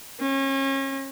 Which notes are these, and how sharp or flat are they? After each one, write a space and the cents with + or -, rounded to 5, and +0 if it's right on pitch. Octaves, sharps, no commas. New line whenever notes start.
C#4 -35